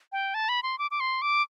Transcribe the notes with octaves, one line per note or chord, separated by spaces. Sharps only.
G5
A5
B5
C6
D6
D6
C6
D6